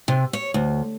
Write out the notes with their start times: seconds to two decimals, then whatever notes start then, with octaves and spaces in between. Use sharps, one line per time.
0.08 C3
0.33 C#5
0.54 D2